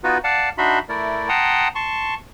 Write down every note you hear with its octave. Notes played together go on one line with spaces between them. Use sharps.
B3 D#4 F4 F#4 B4
D5 F5 F#5 A5
D4 D#4 F#4 E5 B5 C6
A3 E4 A#4 D5
F#5 G5 A5 A#5 C6 D#6
A5 C6 C#6